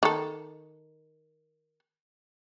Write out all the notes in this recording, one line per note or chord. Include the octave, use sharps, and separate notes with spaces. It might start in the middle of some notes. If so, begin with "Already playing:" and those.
D#3 A4